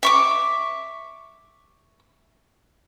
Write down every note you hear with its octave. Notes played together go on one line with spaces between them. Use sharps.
E5 C#6 D6